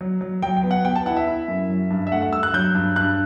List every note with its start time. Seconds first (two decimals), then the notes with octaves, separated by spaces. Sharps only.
0.01 F#3
0.21 F#3
0.42 F#3 G5
0.57 G5
0.63 B3
0.71 F#5
0.85 B3 G5
0.96 A5
1.06 E4 F#5
1.17 E5
1.27 E4
1.48 F#2
1.69 F#3
1.90 G2
2.07 E5
2.12 A3 F#5
2.22 F#5
2.33 G2 E6
2.43 F#6
2.54 F#3 G6
2.75 G2
2.96 G2 F#6